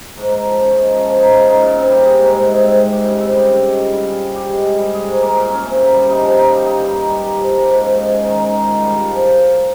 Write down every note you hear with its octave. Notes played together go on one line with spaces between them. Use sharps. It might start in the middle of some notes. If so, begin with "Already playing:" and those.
G#2
A#3
F3
C#4
G#3
F4
F3
D#4
C#3
D#4
A#2
C4
G3
G#4
G#2
G#3
C3
C4
G#3
G4
C#3
C4
G3
G4
G#3
F4
G3
G#4
G3
G4
G#3
G#4
G3
G#4
G#2
A#3
A#2
C#4
C3
A#3
G3
D#4
F3
D#4
G3
D#4
G2
A#3
G3
G4
F3
G4
G#2
C#4
G#3
G#4
D#3
D#4
D#3
F4
G3
F4
F3